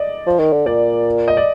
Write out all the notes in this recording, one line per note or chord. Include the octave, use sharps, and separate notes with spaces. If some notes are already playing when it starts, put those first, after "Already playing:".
Already playing: D5 D#5
F3
D#3
D3
A#2 D5
D#5
D5